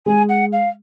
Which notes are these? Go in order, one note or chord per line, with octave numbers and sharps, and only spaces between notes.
G#3 G#5
F#5
F5